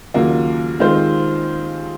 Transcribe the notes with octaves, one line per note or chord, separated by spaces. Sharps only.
D#2 C#3 F#3 A#3 F4
D#3 G#3 C4 F4 C5